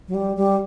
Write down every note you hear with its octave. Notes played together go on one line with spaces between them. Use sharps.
F#3
G3
G3